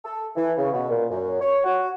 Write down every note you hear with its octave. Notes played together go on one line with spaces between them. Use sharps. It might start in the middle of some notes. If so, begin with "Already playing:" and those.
A4
E3
C#3
B2
A#2
F#2
C#5
F#4